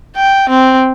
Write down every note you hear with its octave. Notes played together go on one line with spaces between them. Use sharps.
G5
C4